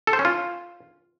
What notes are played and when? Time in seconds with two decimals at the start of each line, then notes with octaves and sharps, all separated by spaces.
0.07 A4
0.13 C5
0.19 C#4
0.25 F4